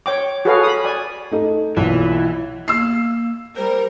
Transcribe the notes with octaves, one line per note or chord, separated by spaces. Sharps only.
C#5 G5 D6
F#4 G#4 A4 B4 C#5 F5
B5 D#6
D5 G#5
A3 D#4 A4
B1 A#2 E3
A#3 E6 C7
G3 A#4 C5